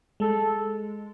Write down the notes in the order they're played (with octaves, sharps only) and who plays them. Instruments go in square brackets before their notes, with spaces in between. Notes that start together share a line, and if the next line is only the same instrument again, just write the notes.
[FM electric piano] G#3 [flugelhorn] A4